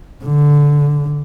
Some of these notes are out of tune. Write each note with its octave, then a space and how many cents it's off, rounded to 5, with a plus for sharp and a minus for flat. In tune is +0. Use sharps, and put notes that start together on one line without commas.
D3 -10